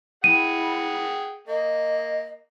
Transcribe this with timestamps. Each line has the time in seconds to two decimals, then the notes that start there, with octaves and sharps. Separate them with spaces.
0.24 E4 G#4 F#5 G5 D#7
1.47 A#3 D#5